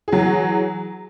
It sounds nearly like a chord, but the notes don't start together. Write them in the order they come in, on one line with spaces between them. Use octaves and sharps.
G#4 F#3 E3